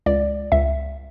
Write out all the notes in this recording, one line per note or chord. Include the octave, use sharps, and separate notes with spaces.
C#2 D5
C#2 E5